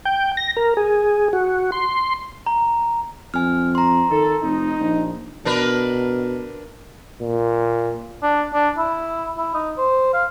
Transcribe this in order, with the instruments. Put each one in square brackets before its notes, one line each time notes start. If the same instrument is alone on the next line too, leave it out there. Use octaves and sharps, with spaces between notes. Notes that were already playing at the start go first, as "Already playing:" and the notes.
[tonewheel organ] G5
A#6
A#4
G#4
F#4
C6
[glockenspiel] A#5
[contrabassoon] F2 [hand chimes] G#5 F6
[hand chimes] A#5 C6
[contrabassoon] D#3 [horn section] A4
[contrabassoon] F1 [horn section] D#4
[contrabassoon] A#1
[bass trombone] B2 [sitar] D4 A#4 B4
[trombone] A#2
[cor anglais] D4
D4
E4
E4
D#4
C5
F5